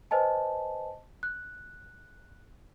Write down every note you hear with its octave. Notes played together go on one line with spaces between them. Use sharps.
B4 C5 D#5 G#5 A5
F#6